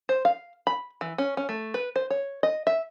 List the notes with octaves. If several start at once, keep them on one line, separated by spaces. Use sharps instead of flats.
C5
F5
B5
E3
C#4
C#4
A3
B4
C5
C#5
D#5
E5